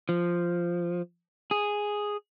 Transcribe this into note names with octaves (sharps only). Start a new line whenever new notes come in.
F3
G#4